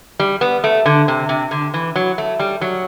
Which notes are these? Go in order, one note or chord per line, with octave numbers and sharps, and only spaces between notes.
G3
B3
A3
D3
C3
C3
D3
E3
F#3
A3
G3
F#3